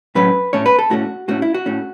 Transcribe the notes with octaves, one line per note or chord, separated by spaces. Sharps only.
A2 F#3 A3 C#4 B4
A2 A3 C#4 C#5
B4
A4
A2 A3 C#4 F#4
A2 A3 C#4 F#4
E4
F#4
A2 A3 C#4